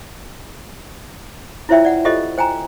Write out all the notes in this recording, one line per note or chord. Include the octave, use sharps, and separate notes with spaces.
E4 F4 C5 C#5 E5 G5
D5 F#5
F4 G4 A4 C5 D#5
C5 G5 G#5 A#5